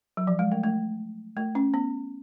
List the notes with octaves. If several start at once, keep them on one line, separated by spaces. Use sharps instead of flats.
F#3
F3
G#3
A3
A3
A3
C#4
B3